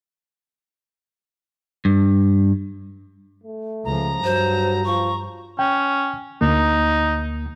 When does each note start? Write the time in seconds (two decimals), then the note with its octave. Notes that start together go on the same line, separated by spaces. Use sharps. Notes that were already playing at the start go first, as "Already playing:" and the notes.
1.85 G2
3.43 A3
3.85 C#2 F3 A#5
4.24 G2 F#3 C5
4.85 F3 C#6
5.59 C#4 G5
6.41 D2 A#3 D#4